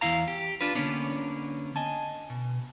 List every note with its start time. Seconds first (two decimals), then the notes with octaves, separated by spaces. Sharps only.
0.01 E2 B2 E4 F5 A#5
0.28 G4
0.61 D4 F4 B4
0.75 D3 A#3 B3 C#4 D4
1.76 D#5 G#5 A5
2.30 B2